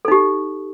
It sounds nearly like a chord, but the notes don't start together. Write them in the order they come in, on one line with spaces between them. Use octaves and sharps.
A4 D#4 G4